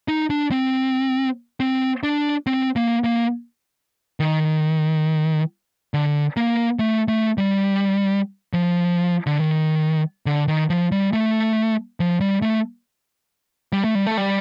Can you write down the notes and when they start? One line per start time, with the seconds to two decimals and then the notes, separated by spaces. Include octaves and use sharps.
0.08 D#4
0.30 D4
0.51 C4
1.60 C4
2.03 D4
2.46 C4
2.76 A#3
3.04 A#3
4.20 D#3
5.94 D3
6.37 A#3
6.79 A3
7.08 A3
7.38 G3
8.53 F3
9.26 D3
9.40 D#3
10.26 D3
10.48 D#3
10.70 F3
10.92 G3
11.13 A3
12.00 F3
12.20 G3
12.42 A3
13.73 G3
13.84 A3
13.95 G3
14.07 A3
14.17 G3